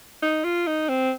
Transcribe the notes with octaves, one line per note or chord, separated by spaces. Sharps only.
D#4
F4
D#4
C4